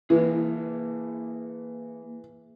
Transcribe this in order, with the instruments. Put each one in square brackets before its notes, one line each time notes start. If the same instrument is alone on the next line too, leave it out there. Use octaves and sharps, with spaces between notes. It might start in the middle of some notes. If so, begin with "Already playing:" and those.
[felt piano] E3 [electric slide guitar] A#3 G#4